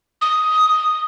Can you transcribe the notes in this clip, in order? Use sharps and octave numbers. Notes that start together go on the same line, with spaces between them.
D#6